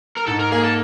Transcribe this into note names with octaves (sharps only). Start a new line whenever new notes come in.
A#4
G#2 A4
A#4
A#3 G#4
A4